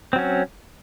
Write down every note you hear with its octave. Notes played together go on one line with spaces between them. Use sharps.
F#3 C4 C#4